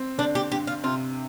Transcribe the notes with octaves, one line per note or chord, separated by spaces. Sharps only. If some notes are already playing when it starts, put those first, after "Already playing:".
Already playing: C4
D3 D4
G4
G2 G4
F4
C3 F4